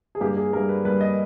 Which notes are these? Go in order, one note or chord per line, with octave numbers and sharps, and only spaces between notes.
G#4
G2 G3 A#3 G4
G#4
G2 G3 A#3 A#4
B4
G2 G3 A#3 B4
D#5